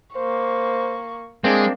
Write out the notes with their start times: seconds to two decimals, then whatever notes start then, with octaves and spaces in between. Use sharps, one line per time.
0.15 A#3 C5 C#6
1.44 G#3 A#3 C4 D4